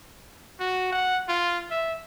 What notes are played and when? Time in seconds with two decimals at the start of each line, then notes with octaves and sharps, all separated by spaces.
0.60 F#4
0.92 F#5
1.28 F4
1.71 E5